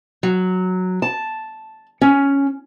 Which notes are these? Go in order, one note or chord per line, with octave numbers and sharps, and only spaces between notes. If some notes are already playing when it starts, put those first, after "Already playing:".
F#3
A5
C#4